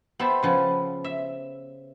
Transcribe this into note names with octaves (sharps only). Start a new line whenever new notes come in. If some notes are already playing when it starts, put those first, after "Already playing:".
B3 G4 A4 C5 E5
C#3 F3 B3
E5